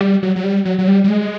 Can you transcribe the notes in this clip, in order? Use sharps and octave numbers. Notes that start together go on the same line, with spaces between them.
G3
F#3
F#3
G3
F#3
F#3
G3
G3
G#3